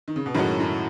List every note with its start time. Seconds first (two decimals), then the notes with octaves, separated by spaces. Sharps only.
0.08 D#3
0.16 C#3
0.26 B2
0.34 F#2 A2 D#3 G#3 C#4 F#4
0.60 A2